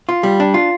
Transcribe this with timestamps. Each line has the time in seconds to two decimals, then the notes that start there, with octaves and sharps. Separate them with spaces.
0.09 F4
0.23 G3
0.40 D4
0.54 F4